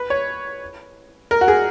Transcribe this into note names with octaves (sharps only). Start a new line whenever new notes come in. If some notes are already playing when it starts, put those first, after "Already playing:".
Already playing: B4
C#5
A#4
F#4
G#4